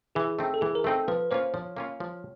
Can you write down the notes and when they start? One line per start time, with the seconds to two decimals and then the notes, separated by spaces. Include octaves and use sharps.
0.15 E3 G#4
0.39 A3 C4 D#4
0.54 A4
0.61 E3 G#4
0.75 A#4
0.84 A3 C4 D#4 A4
1.08 F3 B4
1.31 A#3 C#4 F4 C5
1.54 F3 C#5
1.77 A#3 C#4 F4
2.00 F3